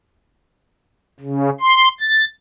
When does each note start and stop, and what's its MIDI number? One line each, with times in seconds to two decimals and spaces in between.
1.20 1.50 49
1.60 1.88 84
2.00 2.25 93